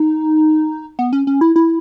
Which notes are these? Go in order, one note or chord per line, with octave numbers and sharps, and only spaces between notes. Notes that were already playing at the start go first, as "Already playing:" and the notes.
Already playing: D#4
B3
C#4
C#4
E4
E4